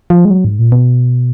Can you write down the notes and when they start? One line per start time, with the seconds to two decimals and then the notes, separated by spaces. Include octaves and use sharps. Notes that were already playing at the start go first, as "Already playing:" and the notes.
0.10 F3
0.25 G#3
0.30 F#3
0.45 G#2
0.59 A#2
0.72 B2